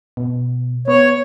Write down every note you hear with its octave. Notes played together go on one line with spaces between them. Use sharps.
B2
B3 C#5